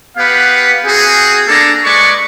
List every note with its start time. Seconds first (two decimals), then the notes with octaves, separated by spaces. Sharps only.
0.17 B3 G4 B4 F5 F#5
0.85 C4 F#4 G#4
1.47 A#3 B3 D4 A4 A#5
1.84 G#3 B4 D5 C#6